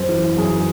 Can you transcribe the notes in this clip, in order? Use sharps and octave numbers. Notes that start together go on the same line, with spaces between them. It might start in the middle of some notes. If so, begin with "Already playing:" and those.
Already playing: F#2 C5
E3
F#2 G#4